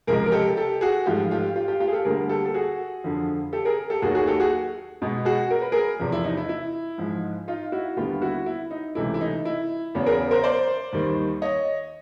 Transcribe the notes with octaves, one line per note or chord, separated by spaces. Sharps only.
C#2 C3 F3 G#3 G#4 A#4
A#4
G4 A4
G4 A4
F#4 G#4
G#2 F3 A3 F4 G4
F4 G4
F4 G4
F4 G4
F4 G4
G#4
G4 A4
D2 D3 G3 A#3 G#4 A#4
G4 A4
A4
F#4 G#4
F2 D3 F3
G4 A4
G#4 A#4
G4 A4
D#2 D#3 F#3 A#3 F#4 G#4
F#4 G#4
G4 A4
F#4 G#4
B2 G#3 B3
F#4 G#4
A#4
B4
G#4 A#4
E2 C3 F3
E4
D#4
E4
E4
G#2 F3 G#3
D#4 F4
E4 F#4
D#2 D3 G3 B3 F4 G4
E4 F#4
E4
D#4
C#2 C3 E3 A3 E4
E4
D#4
E4
E2 C#3 F#3 B3
G#4 A#4
A#4 C5
C5 D5
D#2 D#3 G3
C#5 D#5